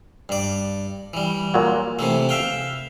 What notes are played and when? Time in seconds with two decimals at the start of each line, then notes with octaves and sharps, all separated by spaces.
0.29 G2 D5
1.13 E3 G3
1.54 A#2 F#3
1.99 C3 E3 A3
2.29 E5 F5 G5